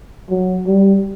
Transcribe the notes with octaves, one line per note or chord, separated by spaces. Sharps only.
F#3
G3